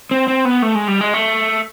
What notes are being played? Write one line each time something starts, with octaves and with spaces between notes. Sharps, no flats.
C4
C4
B3
A3
G#3
G3
G#3
A3